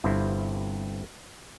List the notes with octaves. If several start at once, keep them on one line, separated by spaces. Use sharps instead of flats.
G1 G2 C3 C4 E4